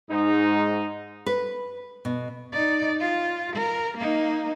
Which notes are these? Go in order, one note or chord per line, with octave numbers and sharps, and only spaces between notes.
G#2 D#4
B4
B2
D#4 D5
F4
A#4
A#3 D#4